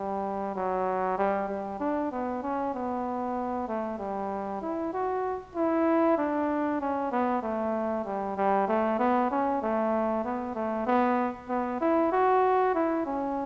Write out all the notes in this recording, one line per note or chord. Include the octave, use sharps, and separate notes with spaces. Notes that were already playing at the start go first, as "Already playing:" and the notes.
Already playing: G3
F#3
G3
G3
D4
B3
C#4
B3
A3
G3
E4
F#4
E4
D4
C#4
B3
A3
G3
G3
A3
B3
C#4
A3
B3
A3
B3
B3
E4
F#4
E4
C#4